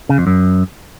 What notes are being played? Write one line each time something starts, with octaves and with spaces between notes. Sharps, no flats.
C#3
F2
F#2